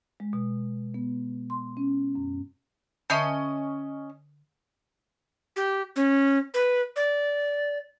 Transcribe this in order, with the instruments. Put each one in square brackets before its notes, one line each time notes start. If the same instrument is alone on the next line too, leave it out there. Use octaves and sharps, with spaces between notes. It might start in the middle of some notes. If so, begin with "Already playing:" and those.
[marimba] G#3
B2
B3
C6
C#4
F#2
[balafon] D3 E5 A5 [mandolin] C#4 D#5
[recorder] G4
C#4
B4
D5